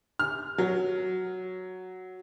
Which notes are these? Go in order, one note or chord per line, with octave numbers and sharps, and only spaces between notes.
F6
F#3